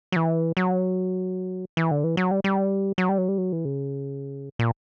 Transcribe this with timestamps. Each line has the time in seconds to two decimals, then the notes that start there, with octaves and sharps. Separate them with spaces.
0.12 F#3
0.16 E3
0.57 F#3
1.77 E3
1.91 D3
2.04 E3
2.17 F#3
2.31 G3
2.44 G3
2.98 F#3
3.09 G3
3.18 F#3
3.28 G3
3.38 F#3
3.52 E3
3.65 C#3
4.59 A#2